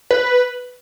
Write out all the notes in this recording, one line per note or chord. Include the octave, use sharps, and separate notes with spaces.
B4